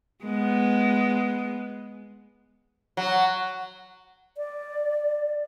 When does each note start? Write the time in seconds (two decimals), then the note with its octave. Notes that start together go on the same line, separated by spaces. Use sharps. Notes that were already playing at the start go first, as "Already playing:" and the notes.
0.25 G#3 B3
2.97 F#3
4.37 D5